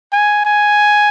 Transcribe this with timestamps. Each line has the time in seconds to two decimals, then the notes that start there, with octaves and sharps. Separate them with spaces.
0.12 G#5
0.45 G#5